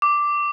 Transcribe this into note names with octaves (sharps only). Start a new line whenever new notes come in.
D6